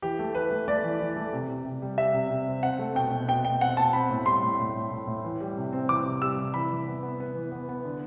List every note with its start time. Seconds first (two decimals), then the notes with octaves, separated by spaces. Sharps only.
0.02 E3 G4
0.19 A3
0.34 E3 B4
0.51 A3
0.68 A3 D5
0.84 E3
1.00 E3
1.16 A3
1.33 C3
1.48 C3
1.65 C3
1.82 G3
1.97 G3 E5
2.14 C3
2.30 C3
2.47 C4
2.63 C4 F#5
2.79 A3
2.95 B2 G5
3.12 B2
3.28 B2 G5
3.44 B2 G5
3.61 C4 F#5
3.77 B2 A5
3.93 C4 B5
4.10 A2
4.26 G3 C6
4.43 A2
4.59 A2
4.75 A2
4.91 A2
5.07 A2
5.24 E3
5.41 G3
5.57 C3
5.73 C4
5.89 E3 D6
6.06 C3
6.22 G3 E6
6.38 C3
6.54 E3 B5
6.70 E3
6.87 B3
7.03 B3
7.20 B3
7.35 E3
7.52 B3
7.69 B3
7.85 D3